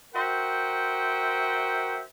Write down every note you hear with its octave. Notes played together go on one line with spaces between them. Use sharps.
F#4 A#4 C5 E5 G5